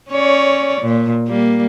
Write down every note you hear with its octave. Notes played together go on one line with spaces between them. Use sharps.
C#4 C#5 D5
A#2
G3 A#3